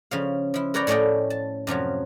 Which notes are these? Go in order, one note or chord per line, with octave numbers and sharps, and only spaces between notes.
C#3 F3 F5
F3 E4
A#4 B4 C#5 D5 G5 A#5
A2 A3 C#4 D5 D#5 G5
A5
F#2 C3 F3 F#3